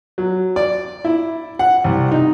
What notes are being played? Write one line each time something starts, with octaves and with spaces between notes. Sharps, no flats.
F#3
D5
E4
F#5
C2
D#4